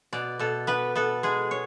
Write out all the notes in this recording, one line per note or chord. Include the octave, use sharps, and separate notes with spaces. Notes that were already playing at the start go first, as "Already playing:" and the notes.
B2 D5
B2 A4
B3 B4
B3 A4
G#3 G#4
C#5